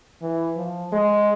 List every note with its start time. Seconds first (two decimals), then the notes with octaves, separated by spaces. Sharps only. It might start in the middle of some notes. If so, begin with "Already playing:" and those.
0.22 E3
0.57 F3
0.92 G#3